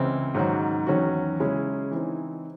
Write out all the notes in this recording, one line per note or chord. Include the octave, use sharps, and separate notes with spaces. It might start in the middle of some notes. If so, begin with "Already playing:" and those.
Already playing: C#2 C#3 E3 C4 E4
G#2 D#3 F#3 C#4 F#4
E2 D#3 F#3 C#4 F#4
C#3 G#3 C#4 E4 G#4
E3 C4 D#4